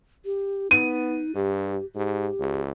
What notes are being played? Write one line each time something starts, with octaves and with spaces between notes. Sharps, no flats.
G4
B3 D#4 D#7
G2 G4
G#2 G4
C#2